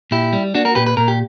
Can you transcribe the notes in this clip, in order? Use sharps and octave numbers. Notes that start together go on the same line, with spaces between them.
A#2 E4 G4
G3
A#3 D4 F#4
F#4 A#4
A#2 G4 B4
B4
A#2 A#4
G4